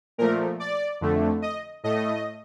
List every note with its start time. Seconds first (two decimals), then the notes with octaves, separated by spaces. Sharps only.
0.18 A#2 F3 A3 A#4
0.60 D5
1.01 F2 D3 A3
1.42 D#5
1.84 A2 A3 D#5